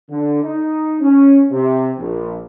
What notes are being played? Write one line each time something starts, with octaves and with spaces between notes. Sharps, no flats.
D3
D#4
C#4
C3
A#1